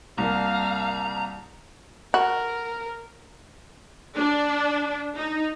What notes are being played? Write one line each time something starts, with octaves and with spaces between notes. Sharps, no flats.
C2 A#3 F5 A#5
F#4 A#4
D4
D#4